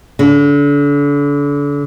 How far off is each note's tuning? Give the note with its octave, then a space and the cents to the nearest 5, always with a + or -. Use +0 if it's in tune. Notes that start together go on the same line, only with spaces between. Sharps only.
D3 -35